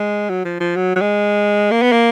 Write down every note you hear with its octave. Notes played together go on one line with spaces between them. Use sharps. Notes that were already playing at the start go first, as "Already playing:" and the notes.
Already playing: G#3
F#3
F3
F3
F#3
F#3
G#3
A#3
B3
A#3